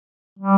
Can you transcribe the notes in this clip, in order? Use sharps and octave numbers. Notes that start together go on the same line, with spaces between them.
G3